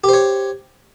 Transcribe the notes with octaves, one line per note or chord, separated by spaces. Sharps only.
G4 C5 C#5